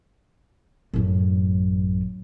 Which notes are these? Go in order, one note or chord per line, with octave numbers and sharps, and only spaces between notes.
A1 F#2